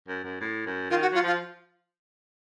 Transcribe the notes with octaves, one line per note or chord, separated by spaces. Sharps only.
F#2
F#2
A2
F#2
D#3 F4
F#4
F#3 F4
F3 F4